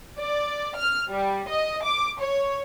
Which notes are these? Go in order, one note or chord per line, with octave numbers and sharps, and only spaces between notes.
D5
F6
G3
D#5
D6
C#5